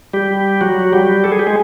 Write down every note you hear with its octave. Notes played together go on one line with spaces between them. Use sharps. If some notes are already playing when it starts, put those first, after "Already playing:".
G3 G4
F#3 F#4
G3 G4
A4
G#4
G4
G#3 G#4